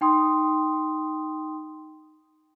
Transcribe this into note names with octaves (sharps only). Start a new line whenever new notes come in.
D#4 G5 C6 D#6